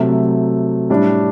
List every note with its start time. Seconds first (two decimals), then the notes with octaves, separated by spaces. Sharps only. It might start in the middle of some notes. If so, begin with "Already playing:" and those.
Already playing: C3 F#3 A3
0.90 A2 G3 D4